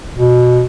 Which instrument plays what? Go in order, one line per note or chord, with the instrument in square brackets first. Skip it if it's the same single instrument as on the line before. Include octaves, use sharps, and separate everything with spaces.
[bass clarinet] B2